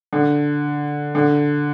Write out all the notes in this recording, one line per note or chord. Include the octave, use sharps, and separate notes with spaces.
D3
D3